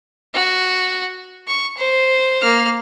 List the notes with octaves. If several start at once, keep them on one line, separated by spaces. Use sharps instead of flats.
F#4
C#6
C5
A#3 F6